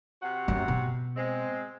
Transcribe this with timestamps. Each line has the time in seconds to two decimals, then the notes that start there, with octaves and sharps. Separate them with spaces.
0.21 C3 F#4 F#5
0.48 F#2 F#3
0.68 B2
1.16 G#3 C4